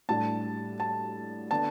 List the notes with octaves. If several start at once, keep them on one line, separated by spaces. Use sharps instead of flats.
A2 G3 D4 A5
A5
D3 B3 D4 A5